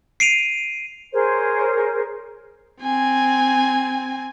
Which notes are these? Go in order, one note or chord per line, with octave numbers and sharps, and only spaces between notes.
C7 D7 D#7 F7
G#4 A#4 C5 C#5
C4 G#5